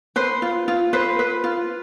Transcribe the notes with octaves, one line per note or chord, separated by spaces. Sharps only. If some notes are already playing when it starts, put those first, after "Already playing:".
B4 C5
F4
F4
B4 C5
B4
F4